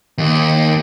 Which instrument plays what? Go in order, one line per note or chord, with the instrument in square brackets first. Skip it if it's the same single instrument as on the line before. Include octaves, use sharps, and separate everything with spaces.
[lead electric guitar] D#2